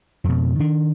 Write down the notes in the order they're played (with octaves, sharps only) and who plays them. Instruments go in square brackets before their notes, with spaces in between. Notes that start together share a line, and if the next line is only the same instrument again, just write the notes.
[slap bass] F2 B2
D#3 D4